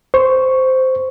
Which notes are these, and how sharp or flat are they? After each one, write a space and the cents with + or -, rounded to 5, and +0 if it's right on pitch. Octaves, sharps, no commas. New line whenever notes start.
C5 -10 C#6 +0